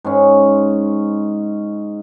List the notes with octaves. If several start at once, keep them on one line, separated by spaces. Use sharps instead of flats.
G#2 C#4